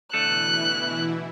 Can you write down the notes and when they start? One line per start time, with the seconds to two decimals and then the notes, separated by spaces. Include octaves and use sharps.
0.13 B2 D3 E3 A3 E4 A4 F#6